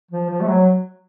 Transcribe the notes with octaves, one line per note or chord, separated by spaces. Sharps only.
F3
F3
A3
F#3